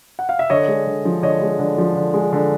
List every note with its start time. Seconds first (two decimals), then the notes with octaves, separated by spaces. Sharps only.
0.19 F#5
0.29 F5
0.39 E5
0.50 D3 C#5 D#5
0.68 G#3
0.86 D3
1.05 F3
1.22 D3 C#5 D#5
1.41 G#3
1.59 D3
1.78 F3
1.96 D3
2.14 G#3
2.32 D3